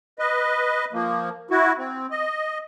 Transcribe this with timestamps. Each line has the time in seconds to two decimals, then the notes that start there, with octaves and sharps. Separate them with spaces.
0.19 B4 D#5
0.93 F3 A#3
1.51 E4 F#4
1.78 C4
2.11 D#5